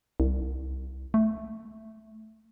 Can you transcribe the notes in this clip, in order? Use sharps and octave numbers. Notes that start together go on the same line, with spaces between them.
C2
A3